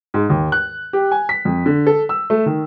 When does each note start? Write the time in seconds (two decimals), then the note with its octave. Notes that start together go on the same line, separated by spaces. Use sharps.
0.14 G#2
0.30 D#2
0.52 F#6
0.93 G4
1.12 G#5
1.29 B6
1.45 F2
1.66 D3
1.87 A4
2.09 E6
2.30 A3
2.46 D#3